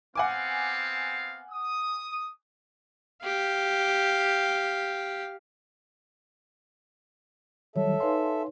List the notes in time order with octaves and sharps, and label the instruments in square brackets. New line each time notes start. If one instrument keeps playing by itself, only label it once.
[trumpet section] B3 C4 F5 [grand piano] F#5 G#5 D6
[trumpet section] D#6
[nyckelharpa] G4 F5
[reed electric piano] D#3 F#3 G3 [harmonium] A4 E5 [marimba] C#5
[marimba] D#4 B4 C#5 [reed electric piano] F5 G#5 C6